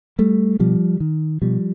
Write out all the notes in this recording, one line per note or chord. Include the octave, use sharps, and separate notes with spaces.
G3 A3
B2 F3 G3
D#3
B2 F3 G3